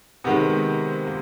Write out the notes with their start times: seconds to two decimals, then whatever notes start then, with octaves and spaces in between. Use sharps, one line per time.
0.24 C3 D#3 G#3 B3
1.07 A#3